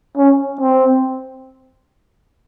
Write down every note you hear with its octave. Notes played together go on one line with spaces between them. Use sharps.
C#4
C4